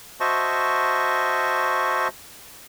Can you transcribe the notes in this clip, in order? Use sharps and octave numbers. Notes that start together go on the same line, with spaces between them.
F#4 C5 D#5 E5 A5 C#6